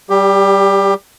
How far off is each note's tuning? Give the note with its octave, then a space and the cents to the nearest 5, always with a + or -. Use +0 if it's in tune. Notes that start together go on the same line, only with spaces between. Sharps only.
G3 -15 G4 +20